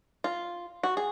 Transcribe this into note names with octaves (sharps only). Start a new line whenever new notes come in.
F4
F#4
G#4